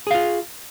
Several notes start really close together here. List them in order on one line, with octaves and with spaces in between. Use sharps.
G#4 F5 F4